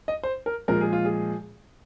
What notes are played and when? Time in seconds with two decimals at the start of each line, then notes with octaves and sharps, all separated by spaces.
0.08 D#5
0.23 C5
0.46 A#4
0.68 A#2 F3 G#3 A#4
0.81 G#4
0.93 F4
1.05 G#4